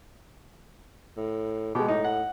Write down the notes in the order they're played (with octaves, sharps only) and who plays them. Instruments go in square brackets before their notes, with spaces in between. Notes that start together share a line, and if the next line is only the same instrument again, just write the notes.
[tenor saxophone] A2
[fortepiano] B2 G#3 [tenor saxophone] G4
[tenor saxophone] A2 [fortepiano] D#4
[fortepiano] F#5